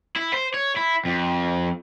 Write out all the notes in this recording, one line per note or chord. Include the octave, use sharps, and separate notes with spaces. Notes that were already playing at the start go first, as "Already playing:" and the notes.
E4
C5
C#5
E4
F2